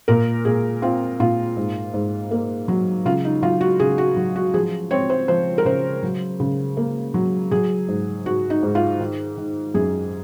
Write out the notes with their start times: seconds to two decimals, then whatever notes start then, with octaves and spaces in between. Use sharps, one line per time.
0.08 A#2 A#4
0.45 A#2 G#4
0.82 C4 F4
1.20 A#2 F4
1.57 G#2
1.94 G#2
2.31 A#3
2.68 F#3
3.05 C#3 F4
3.25 D#4
3.42 F#3 F4
3.61 F#4
3.80 C#3 G#4
3.98 F#4
4.17 F#3
4.36 F#4
4.54 F3 G#4
4.91 C4 C#5
5.10 C5
5.28 F3 C5
5.58 A#4
5.65 C#3 C5
6.03 F#3
6.40 C#3
6.77 A#3
7.14 F#3
7.51 F#3 G#4
7.88 G#2
8.26 G#2 F#4
8.50 D#4
8.63 G#2
8.75 F4
9.00 D#3
9.37 D#3
9.74 F#2 G#4